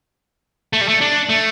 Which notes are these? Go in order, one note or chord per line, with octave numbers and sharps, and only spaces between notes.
A3
G3
A3
D4
A3